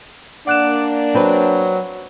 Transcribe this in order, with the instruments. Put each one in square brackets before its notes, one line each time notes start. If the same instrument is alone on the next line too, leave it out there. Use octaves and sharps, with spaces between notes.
[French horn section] A#3 D4 [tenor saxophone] D5 [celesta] F#5 F#6 E7
[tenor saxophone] F#3 [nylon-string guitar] C4 B4